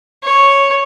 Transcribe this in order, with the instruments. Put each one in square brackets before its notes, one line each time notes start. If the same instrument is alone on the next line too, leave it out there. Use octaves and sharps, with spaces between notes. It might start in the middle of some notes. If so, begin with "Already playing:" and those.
[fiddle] C#5